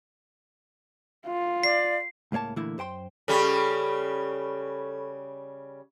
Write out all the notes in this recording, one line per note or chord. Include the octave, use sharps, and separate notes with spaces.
F4
D5 C7
C#2 A2 A#3 C#5 A5
A#2 D3 E3 A3 A#3 E4
F#2 C5 G5 C6
C#3 G3 A4 B5 C#6